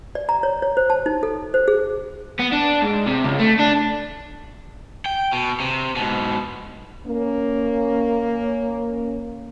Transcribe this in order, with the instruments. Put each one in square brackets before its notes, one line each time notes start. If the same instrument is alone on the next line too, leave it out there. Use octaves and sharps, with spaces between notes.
[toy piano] D5
A#5
C#5
C#5
C5
A5
D#4
A4
C5
G#4
[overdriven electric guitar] B3
D4
G#2
C3
C#2
A3
D4
G5
B2
C3
G#2 B2
[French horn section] A#3 C#4